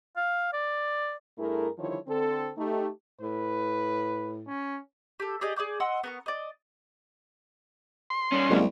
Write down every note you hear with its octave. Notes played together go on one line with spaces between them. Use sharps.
F5
D5
G2 A3 E4 G#4 A#4
D3 D#3 F3 G3 E4 C#5
D3 C4 A4
A3 D#4 G4
A2 B4
C#4
G4 A4
G4 G#4 D5 D#5
G#4 D5 D6 G6
D#5 F#5 C6 E6
B3 A#4 C#6
D5 D#5
C6
G3 C#4
C2 F#3 G#3 A#3